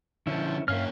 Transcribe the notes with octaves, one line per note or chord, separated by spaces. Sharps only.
D3 F3 C#4 E4
G2 A#3 C#4 E5 F5 F6